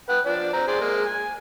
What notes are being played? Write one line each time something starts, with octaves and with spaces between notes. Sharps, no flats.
B4 F#5 G5
F3 D4 D5
C4 A#5
G#4 C5 D5
G#3 A#3
G#5